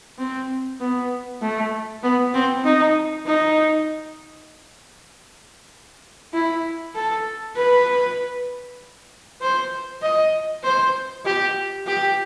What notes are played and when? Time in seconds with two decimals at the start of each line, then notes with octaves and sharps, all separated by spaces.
0.18 C4
0.80 B3
1.41 A3
2.02 B3
2.34 C4
2.64 D#4
3.26 D#4
6.33 E4
6.95 A4
7.56 B4
9.41 C5
10.02 D#5
10.63 C5
11.26 G4
11.86 G4